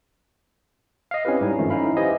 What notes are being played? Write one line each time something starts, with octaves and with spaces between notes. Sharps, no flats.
D#5 F5
C4 C#4 E4 G4 B4
G#2 G3 D#4 G#5
G2 D#3 F3 A3 C#4
C#4 D#4 E4 F5 B5
G4 B4 C5 D#5 E5 G#5